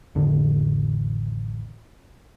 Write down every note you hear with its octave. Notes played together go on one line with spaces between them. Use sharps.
A1 F2 D3 D#3